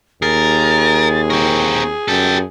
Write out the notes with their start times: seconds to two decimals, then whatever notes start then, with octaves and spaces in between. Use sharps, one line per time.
0.22 D#2 G#4 A#4 A6
1.30 C4 A#4 C#6
2.08 F#2 G4 A4 A6